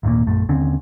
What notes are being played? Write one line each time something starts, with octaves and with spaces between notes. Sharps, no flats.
G#1 D#2 A#2 A#3
A#1 F#2 A3
D#2 D3 C4 C#4